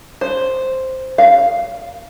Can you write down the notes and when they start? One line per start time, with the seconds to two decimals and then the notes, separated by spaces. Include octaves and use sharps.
0.21 C5
1.18 F5